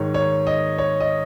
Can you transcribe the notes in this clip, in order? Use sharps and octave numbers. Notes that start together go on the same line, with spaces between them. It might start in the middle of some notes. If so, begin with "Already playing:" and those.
Already playing: G#2 D#3 C#5
C#5
D#5
C#5
D#5